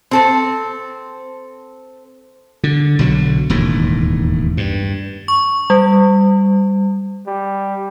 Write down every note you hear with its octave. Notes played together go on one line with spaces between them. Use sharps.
C4 A4 C5
D3
B1 D3 F#3
E1 D#2 A2
G2
C#6
G3
G3